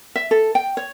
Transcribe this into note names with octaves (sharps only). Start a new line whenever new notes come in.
E5
A4
G5
C#5